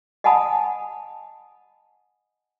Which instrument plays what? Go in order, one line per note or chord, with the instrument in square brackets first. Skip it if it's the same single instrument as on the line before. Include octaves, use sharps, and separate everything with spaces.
[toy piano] D#5 F#5 G#5 A5 B5 D#6